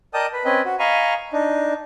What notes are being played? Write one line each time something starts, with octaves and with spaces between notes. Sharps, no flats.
A#4 D5 D#5 G5 A5 D#6
B4
C4 C#4 B4 D#5
F#4
D#5 F5 G#5 A#5 B5 C#6
D4 D#4